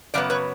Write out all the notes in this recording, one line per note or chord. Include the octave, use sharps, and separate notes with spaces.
F#2 C#3 F#3 B3 D5
B4 C#5